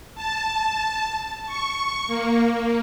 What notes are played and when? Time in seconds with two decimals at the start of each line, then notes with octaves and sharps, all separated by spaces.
0.15 A5
1.46 C#6
2.07 A#3